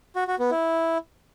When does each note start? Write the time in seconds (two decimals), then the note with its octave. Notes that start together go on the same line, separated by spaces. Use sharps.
0.16 F#4
0.28 F#4
0.39 B3
0.51 E4